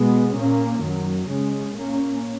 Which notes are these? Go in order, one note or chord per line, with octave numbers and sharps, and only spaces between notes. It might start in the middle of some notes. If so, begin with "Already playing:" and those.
Already playing: B2 G#3 B3
A#2 A#3 C#4
F#2 D#3 F#3
C#3 G#3 C#4
A#2 A#3 C#4